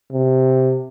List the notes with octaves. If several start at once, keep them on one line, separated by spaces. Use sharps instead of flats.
C3